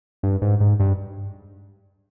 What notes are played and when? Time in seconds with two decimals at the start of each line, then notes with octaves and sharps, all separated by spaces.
0.23 G2
0.42 G#2
0.60 G#2
0.80 G2